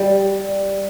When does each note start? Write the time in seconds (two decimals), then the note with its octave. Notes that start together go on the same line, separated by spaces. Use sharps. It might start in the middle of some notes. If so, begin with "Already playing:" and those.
Already playing: G3